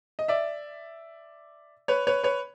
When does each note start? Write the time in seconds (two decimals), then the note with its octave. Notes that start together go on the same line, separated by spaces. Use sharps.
0.19 D#5
0.28 D5 E5
1.88 B4 C#5
2.07 B4 C#5
2.23 B4 C#5